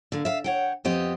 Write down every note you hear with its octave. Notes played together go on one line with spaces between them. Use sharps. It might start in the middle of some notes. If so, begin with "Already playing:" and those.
D3 A#3
E5 F5
C#5 F#5 G5
F2 B3 C4 G4 D#5